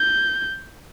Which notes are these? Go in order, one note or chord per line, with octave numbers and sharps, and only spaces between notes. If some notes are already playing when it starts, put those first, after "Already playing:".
Already playing: G6